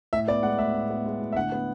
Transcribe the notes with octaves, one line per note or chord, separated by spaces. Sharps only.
A2 E5
B3 D5
G#3 F#5
A2 E5
A2
B3
G#3
A2
E5
D3 F#5
B3